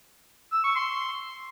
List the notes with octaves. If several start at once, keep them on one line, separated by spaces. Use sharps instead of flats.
E6
C#6
C6